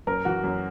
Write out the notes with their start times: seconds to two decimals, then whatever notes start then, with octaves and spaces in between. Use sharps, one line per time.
0.07 F#2 A#4
0.25 E3 F#4
0.44 F#2